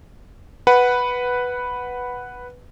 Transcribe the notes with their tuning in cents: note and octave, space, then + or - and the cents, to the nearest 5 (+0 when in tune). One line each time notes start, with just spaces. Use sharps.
B4 +0 F#5 +0